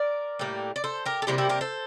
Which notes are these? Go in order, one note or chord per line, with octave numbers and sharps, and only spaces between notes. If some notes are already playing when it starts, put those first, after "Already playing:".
Already playing: A#4 D5
A2 G3 A#3
D5
A4 C5
G4 A#4
A4
C3 G3 A#3 E4 G4
E4 G4
G4 A#4
A4 C5